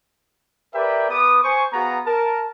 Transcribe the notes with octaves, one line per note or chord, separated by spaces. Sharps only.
G4 A#4 B4 D5 E5 G5
B3 B4 D6 D#6
C5 G#5 C#6
B3 F#4 G#4 F5 A#5
A#4 A5